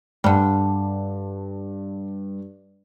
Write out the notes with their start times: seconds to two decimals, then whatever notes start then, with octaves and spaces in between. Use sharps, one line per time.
0.24 G2 D3 G3